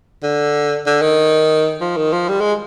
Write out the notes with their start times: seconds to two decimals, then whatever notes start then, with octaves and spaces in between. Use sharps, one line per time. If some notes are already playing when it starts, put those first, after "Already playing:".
0.23 D3
0.86 D3
1.02 D#3
1.81 F3
1.97 D#3
2.12 F3
2.29 G3
2.40 G#3